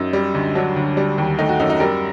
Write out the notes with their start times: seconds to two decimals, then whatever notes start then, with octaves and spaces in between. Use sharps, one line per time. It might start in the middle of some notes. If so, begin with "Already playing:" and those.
Already playing: F#2 D#4
0.13 G3
0.34 D2
0.55 F#3 D4
0.76 D2
0.97 G3
1.18 D#2
1.39 A3 D#4
1.49 F#4
1.60 F#2 D#4
1.70 D#4
1.80 G3 A#4